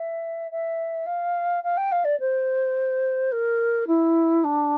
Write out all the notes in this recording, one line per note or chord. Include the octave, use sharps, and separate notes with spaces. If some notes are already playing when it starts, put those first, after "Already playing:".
Already playing: E5
E5
F5
F5
G5
F5
D5
C5
A#4
E4
D4